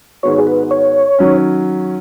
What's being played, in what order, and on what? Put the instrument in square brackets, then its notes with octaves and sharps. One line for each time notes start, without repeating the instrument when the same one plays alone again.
[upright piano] G#2 D#3 G#3 B3 F#4 [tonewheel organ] C#5
[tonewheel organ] G#4
B4
C#5
[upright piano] D#3 F#3 C#4